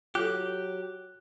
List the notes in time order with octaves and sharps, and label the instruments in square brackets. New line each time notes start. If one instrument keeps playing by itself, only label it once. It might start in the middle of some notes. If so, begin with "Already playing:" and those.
[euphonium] F#3 [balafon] F4 A4 [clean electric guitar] G4 [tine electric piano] F#6